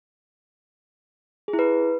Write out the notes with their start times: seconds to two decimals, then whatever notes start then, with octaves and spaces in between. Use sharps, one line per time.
1.48 G#4
1.53 E4
1.59 B4